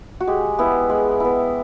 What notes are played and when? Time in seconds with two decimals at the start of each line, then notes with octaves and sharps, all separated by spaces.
0.20 F#4
0.27 G#3 G4
0.59 B3 E4
0.89 G#3
1.20 B3 E4